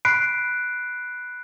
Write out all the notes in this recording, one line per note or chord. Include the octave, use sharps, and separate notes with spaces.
B5 F#6 B6 C7 D7